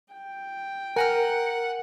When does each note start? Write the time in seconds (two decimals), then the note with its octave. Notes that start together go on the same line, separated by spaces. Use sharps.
0.13 G5
0.96 A#4 F#5 G#5 A#5 F6